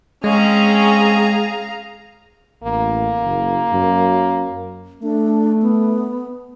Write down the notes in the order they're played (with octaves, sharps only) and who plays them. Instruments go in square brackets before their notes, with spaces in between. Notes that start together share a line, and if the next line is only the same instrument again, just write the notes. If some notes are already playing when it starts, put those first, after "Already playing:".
[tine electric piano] G#3 [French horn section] C4 C#4 [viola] G#4 [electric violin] F5 A#5
[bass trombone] A1 [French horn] A#3
[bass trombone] F#1
F#2
[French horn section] A3 [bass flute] D4
[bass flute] B3